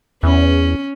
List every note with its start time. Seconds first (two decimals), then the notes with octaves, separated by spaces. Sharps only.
0.23 E2 C#4